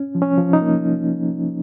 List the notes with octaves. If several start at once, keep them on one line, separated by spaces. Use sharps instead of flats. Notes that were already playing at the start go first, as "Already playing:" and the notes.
Already playing: C#4
F3
C#4
F3
D#4
A#3